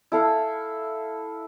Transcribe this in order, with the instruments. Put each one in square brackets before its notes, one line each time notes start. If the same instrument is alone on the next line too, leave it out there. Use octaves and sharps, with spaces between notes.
[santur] E4 A4 F5